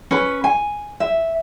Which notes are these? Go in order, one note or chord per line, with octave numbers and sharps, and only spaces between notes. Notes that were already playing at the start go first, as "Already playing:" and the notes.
C#4 B4
G#5
E5